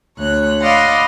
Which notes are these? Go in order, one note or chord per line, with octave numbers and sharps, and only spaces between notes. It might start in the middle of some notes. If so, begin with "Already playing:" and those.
D2 C#5 F#6
D5 D#5 F5 F#5 B5 C6